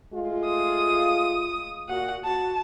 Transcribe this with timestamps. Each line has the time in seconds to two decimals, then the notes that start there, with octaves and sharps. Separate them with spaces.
0.13 G#3 A3 F4
0.46 D#6
1.89 A#2 F#4 F#5
2.25 F#4 A5